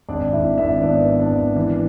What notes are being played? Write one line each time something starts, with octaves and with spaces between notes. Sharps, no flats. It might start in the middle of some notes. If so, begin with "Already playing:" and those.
G#1 D4 D5
G#1 E4 E5
G#1 E4 E5
B3 D4 D5
B3
D4 D5
G#1
E3